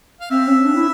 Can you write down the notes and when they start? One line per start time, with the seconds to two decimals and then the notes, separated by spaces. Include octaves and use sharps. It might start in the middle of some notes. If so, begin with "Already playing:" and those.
0.21 F5
0.30 C4 E5
0.48 C#4
0.64 D4
0.75 E4